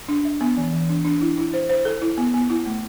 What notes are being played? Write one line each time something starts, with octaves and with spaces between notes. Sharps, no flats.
D4
E5
B3
E3
E3
D4
D4
E4
E4
C5
C5
A4
E4
B3
B3
E4
A3